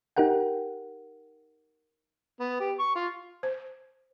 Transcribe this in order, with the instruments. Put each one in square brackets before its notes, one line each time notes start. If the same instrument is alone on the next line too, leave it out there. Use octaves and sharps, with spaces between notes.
[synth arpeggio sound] D#4 G4 A#4 F#5 G5
[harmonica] B3
G4
C#6
F4
[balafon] C5